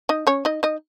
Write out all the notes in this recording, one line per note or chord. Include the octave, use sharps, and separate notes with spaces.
D#4 D#5
C#4 C#5
D#4 D#5
D#4 D#5